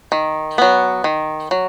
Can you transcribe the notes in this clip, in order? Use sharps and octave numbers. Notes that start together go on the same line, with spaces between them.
D#3
F#3 B3
D#3
F#3